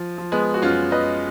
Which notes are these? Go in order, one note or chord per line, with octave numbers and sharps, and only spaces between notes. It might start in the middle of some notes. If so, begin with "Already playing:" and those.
Already playing: F3
F3
G#3 B3
F#4
F#2 C#4 F4
B4 D#5